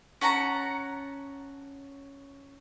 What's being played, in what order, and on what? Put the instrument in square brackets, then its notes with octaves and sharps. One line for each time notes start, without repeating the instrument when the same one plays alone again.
[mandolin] C#4 F#5 A5 A#5